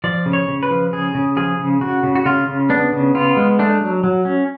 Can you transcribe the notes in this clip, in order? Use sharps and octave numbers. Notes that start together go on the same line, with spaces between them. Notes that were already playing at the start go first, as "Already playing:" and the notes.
F3 D5
C#3
C#5
C#3
B4
F3
C#3 G#4
C#3
F3 G#4
C#3
C#3 F#4
C#3
F#4
C#3 F4
C#3
B3 D4
C#3
B3 F4
G#3
A3 D4
F#3
F#3
C#4